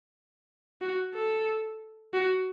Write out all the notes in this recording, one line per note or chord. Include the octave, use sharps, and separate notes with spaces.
F#4
A4
F#4